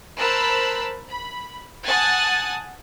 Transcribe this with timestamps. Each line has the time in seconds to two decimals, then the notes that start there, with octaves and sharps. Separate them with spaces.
0.18 A#4 C5 A5 B5 E6 F#6
1.09 B5
1.86 F#5 G#5 A5 D#6 F#6 A6